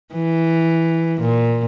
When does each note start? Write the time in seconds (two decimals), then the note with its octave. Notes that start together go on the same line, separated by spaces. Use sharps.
0.14 E3
1.20 A#2